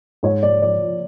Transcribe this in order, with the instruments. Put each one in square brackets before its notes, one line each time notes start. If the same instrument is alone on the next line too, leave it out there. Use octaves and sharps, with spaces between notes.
[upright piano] G#2 [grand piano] C#5
[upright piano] G#2 [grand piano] D5
[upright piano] F3 [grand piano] D5
[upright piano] F3